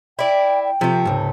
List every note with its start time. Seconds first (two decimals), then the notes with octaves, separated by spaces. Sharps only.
0.19 E4 D5 G5
0.63 G5
0.81 C3 F3 A3
1.05 C#2 G#2